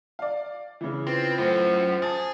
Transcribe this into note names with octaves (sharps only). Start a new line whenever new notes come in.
D5 F5
C#3 E3
C4 F4 B4
F#2 A2 C5
G#4 A5 A6